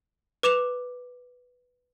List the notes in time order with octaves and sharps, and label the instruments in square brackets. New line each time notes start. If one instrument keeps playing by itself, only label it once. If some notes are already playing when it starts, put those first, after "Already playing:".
[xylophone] B4 D6 E7 F7